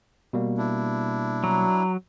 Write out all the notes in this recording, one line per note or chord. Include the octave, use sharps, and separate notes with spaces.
B2 G3 A#3
D4 E4
F#3 A#5